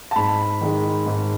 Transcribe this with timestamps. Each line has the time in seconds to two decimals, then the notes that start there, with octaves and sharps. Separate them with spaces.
0.11 A5
0.16 G#2 B5
0.61 D#3 G#3 D#4
1.06 G#2